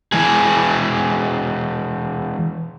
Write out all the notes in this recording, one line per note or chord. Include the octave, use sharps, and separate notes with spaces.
E3 G#3 G#4